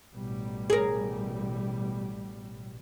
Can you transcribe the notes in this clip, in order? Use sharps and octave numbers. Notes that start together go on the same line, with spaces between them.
A1 B2 G3
G#4 A#4